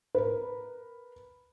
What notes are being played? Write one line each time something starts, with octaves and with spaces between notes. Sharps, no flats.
A#4 B4